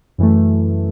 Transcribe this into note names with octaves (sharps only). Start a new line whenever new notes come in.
F#2 E3 A3